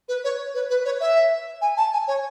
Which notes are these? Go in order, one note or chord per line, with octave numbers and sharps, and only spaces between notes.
B4
C#5
B4
B4
C#5
E5
G#5
A5
G#5
C#5